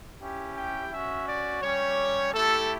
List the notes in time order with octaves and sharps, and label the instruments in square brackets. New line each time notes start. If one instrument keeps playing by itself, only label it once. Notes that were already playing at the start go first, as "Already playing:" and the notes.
[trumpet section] C#4 E4 G4
G5
C#4 F#4 E5
D5
G3 C#4 G4 C#5
A3 E4 G4 A4